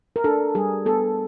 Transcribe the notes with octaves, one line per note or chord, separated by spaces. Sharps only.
A#4
D4 A4
G3 G#4
B3 A4